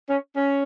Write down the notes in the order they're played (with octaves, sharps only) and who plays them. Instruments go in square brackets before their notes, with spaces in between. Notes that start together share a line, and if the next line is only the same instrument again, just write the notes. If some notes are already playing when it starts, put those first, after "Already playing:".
[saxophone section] C#4
C#4